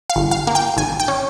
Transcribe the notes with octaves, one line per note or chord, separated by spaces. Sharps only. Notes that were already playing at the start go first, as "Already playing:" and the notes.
F5
G1
F5
A#3
G5
G#1 G#5
G5
C#4